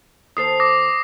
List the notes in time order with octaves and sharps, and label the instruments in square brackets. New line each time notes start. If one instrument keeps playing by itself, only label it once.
[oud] D#2 A4 C5 [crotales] D#6 C7
[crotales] D6 D#6 A#6